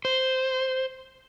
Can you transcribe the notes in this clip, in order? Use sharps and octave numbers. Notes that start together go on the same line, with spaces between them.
C5